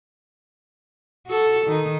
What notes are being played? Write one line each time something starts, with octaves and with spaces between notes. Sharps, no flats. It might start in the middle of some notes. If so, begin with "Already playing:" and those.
F#4 A4
D#3 D#4